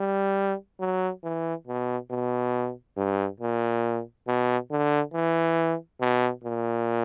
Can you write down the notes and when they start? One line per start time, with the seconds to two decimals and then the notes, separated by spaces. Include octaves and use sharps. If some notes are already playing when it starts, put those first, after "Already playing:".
Already playing: G3
0.80 F#3
1.24 E3
1.67 B2
2.10 B2
2.97 G2
3.40 A#2
4.27 B2
4.71 D3
5.14 E3
6.01 B2
6.44 A#2